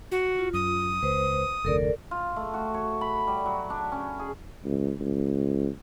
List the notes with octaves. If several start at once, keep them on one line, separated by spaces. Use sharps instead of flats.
F#4
F4
F#2 D#6
C#2 B4 C5
F1 D2 A4 A#4 D5
F4
A3
F#4
C#5
B5
G3
F#3
D4
C#4
G#4
C#2
C#2